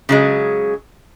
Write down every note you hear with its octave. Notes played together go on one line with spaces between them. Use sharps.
C#3 F#3 G#3